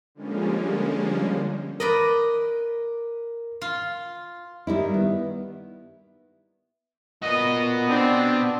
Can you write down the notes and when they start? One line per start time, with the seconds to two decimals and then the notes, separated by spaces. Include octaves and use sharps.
0.15 D3 F3 G3 G#3 A#3 C#4
1.80 A#4 B4 D5 D#5
3.61 F4
4.67 D#3 G3 E4
4.94 B3
7.22 A#2 B3 F#4 D#5
7.89 C4 D4